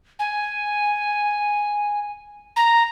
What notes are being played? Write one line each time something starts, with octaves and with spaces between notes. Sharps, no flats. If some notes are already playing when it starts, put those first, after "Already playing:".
G#5
A#5